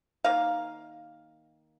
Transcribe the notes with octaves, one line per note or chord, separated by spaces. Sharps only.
D#3 A#3 F5